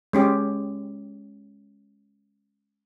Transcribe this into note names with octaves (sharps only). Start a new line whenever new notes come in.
G#3 C#4 G4